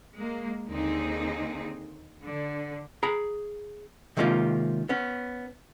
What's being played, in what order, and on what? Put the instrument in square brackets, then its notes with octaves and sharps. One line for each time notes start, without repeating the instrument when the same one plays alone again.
[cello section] G#3 A#3
D#2 D3 C4 D#4 G#4
D3
[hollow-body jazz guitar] G#4 A#5 B5
C3 D#3 G#3 A#3 C#4 F4
B3 C#4